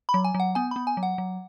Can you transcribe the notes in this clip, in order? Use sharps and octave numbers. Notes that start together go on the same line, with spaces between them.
B5
F#3
G#5
F#3
F#5
B3 G#5
B3 B5
G#5
F#3
F#5
F#3